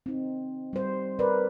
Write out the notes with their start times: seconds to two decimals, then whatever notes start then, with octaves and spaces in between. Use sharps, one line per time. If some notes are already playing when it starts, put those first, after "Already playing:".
0.06 C4 D#4
0.73 G3 C5
1.19 A#4 B4 D5